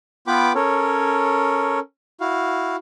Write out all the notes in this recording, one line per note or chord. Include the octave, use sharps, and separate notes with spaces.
B3 F4 B4 G5 B5 D6
C#4 A4 A#4 C#5
E4 F#4 F5